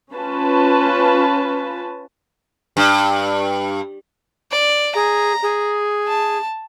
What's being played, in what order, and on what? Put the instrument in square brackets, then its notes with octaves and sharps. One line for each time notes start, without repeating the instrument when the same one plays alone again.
[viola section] C#4 F4 B4 A5
[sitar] G2
[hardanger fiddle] D5
[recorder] G#4 [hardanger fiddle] A#5
[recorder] G#4
[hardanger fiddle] A5